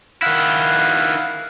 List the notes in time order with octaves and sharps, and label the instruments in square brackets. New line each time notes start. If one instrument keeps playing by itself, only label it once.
[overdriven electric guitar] D#3 E4 [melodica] F5 F#5